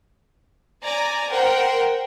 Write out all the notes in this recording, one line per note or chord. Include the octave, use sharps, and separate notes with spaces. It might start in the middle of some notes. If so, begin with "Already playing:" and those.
D5 G#5 A#5
A#4 C5 F#5 G5